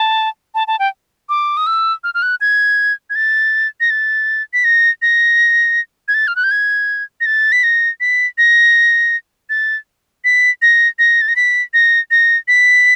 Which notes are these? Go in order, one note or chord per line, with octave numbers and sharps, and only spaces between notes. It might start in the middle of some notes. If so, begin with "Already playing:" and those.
Already playing: A5
A5
A5
G5
D6
D#6
E6
F6
F6
F#6
G#6
G#6
A6
A#6
A6
B6
A#6
A#6
G#6
A6
F6
F#6
G6
G#6
A#6
A6
B6
A#6
B6
A#6
A6
B6
A#6
A#6
A6
A#6
B6
A#6
A#6
B6